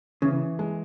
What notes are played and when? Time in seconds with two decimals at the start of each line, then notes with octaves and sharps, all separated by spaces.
0.22 C#3 E3
0.59 G#3